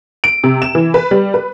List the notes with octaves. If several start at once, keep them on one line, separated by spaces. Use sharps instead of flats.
D7
C3
E7
E3
B4
G3
B4